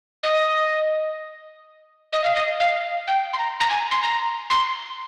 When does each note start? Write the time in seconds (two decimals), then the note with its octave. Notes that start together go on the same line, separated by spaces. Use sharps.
0.23 D#5
2.13 D#5
2.24 F5
2.35 D#5
2.60 F5
3.08 G5
3.33 C6
3.38 A#5
3.60 A#5
3.70 G#5
3.91 C6
4.03 A#5
4.50 C6